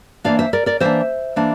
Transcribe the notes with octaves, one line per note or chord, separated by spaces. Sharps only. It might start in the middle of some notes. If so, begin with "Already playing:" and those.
E3 A#3 D4 D5 F5
C5 E5
A#4 D5
A#4 D5
E3 A#3 D4 C5 E5
E3 A#3 D4